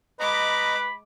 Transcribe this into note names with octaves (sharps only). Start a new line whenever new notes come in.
G#3 B4 D#5 A#5 B5 D6